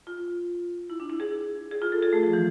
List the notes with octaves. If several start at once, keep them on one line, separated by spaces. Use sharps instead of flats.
F4
E4
D4
E4
G#4
G#4
F4
A4
G#4
A3
F3
E3